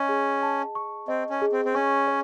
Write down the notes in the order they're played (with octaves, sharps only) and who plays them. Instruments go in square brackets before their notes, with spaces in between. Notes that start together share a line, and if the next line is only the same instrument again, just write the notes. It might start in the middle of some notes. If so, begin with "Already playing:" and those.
Already playing: [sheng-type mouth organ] C#4 [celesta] D#5
[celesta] G#4
A5
C#6
[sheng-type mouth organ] C4 [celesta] D#5
[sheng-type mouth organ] C#4
[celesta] G#4
[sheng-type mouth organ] C4
C4
[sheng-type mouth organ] C#4 [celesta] C#6
[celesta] C#5